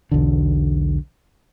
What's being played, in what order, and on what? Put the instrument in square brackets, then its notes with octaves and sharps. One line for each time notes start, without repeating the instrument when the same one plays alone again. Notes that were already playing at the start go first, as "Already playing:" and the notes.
[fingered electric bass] B1 E2 D3